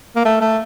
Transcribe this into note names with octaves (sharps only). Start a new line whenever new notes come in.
A#3
A3
A3